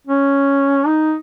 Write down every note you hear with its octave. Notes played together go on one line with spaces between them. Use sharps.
C#4
D#4